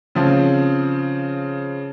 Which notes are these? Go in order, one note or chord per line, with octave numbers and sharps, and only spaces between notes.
C#3 F3 C4